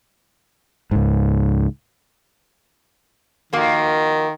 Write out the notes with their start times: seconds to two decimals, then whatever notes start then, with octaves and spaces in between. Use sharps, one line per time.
0.91 C#2 G#2
3.53 D#3 F3 A#3 F#4